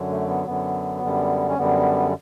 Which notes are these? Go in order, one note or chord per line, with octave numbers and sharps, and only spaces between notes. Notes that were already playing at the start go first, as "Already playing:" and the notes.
Already playing: F#2 D3 F#3
A3
B3
F#2 D3 F#3 B3
F#2 D3 G3
C#4
F#2 D3 G3 B3